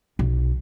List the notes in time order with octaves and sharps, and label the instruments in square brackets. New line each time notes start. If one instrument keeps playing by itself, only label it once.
[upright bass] B1